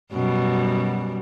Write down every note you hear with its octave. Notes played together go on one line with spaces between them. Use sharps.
F#2 B2 G3